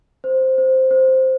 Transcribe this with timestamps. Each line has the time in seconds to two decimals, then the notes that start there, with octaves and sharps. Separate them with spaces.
0.24 C5
0.58 C5
0.91 C5